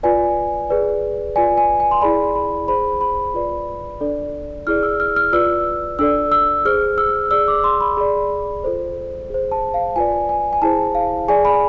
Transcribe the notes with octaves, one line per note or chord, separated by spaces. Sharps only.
F4 B4 D5 G#5
G#4 B4 D5
F4 B4 D5 G#5
G#5
G#5
C6
E4 G#4 D5 B5
B5
G#4 C5 B5
B5
F4 B4 D5
D4 A4 D5
E4 G#4 D5 F6
E6
F6
F6
F4 B4 D5 E6
D4 A4 D5 E6
E6
G#4 C5 F6
E6
G#4 D5 E6
D6
C6
B5
G#4 D5 B5
F4 A4 C5
G#4 C5
A5
F5
F4 B4 D5 G#5
G#5
G#5
E4 G#4 C5 A5
F5
G#4 D5 G#5
B5